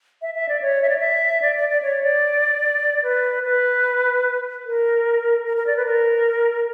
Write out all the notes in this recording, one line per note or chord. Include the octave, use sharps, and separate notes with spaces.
E5
E5
D5
C#5
E5
D5
E5
D5
D5
D5
C#5
D5
B4
B4
A#4
A#4
A#4
D5
B4
A#4